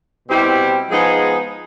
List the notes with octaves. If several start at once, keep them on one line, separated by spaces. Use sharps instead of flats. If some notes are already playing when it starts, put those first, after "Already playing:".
B2 G3 C4 E4 G4
F3 G#3 B3 D#4 G#4